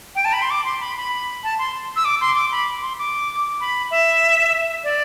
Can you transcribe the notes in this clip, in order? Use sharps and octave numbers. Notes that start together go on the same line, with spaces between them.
G5
A5
B5
C6
D6
C6
B5
B5
A5
C6
E6
D6
C6
D6
B5
C6
D6
B5
E5
D5